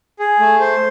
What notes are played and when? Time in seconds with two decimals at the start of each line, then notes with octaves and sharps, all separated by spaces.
0.19 G#4
0.40 A3
0.60 C5